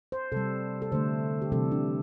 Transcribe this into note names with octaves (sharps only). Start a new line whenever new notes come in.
C5
C3 G3 A4
A4
D3 A3 C5
G4
C3 E3 G3 A4
D4